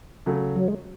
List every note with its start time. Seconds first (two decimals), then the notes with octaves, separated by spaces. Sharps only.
0.26 C#3 F#3 A3
0.56 F#3
0.68 G#3